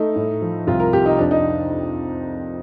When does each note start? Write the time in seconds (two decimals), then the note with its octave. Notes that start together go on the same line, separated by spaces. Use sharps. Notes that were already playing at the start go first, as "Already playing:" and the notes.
Already playing: A3 D#4
0.16 A2
0.42 F3
0.67 C2 F4
0.80 A#4
0.93 C3 G4
1.06 D#4
1.19 F2 D4
1.31 D#4